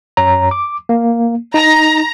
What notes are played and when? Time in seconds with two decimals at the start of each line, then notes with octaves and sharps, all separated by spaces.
0.17 F#2 C#5 A#5
0.51 D6
0.89 A#3
1.54 D#4 A#5